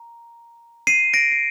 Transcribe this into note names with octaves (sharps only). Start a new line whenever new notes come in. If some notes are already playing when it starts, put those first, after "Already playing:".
Already playing: A#5
C7 D#7
A#6 D7
C7